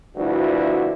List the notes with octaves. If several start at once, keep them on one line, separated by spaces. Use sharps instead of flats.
D2 G2 F3 E4 F#4 D5